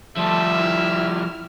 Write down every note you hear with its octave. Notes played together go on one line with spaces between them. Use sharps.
F3 G3 A3 E5 A5
E4 F6